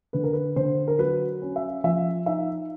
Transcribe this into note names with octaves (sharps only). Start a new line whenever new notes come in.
D3 B4
A#4
B4
D3 C5
A#4
F#3 B4
C#4
E5
F3 E5
D#4 E5